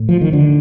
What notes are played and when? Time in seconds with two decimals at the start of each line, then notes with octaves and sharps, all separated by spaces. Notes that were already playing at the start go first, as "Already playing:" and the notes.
Already playing: A2
0.09 F3
0.21 D#3
0.33 D3